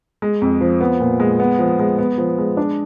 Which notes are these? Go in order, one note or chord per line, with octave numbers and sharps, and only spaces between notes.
G#3
F2
F3
B3
A#2
G#3
B3
F3
G#3
B3
F3
G#3
D4